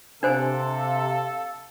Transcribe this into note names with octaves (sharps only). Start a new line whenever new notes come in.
C3 D4 A4 C5 F5 G#5